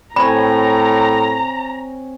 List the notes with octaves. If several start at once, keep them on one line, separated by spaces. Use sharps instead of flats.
A2 C4 C#5 G#5 A#5 B5